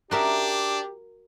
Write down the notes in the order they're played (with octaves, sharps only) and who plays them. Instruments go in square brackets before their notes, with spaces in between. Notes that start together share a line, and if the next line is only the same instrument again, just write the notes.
[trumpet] D4 [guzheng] F#4 A#4 E5 [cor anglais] G4